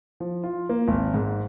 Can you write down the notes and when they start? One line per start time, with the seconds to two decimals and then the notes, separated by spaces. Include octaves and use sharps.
0.20 F3
0.44 F4
0.69 A#3
0.88 G#1
1.14 G#2